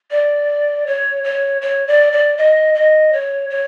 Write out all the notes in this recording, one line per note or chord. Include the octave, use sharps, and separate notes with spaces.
D5
C#5
C#5
C#5
D5
D5
D#5
D#5
C#5
C#5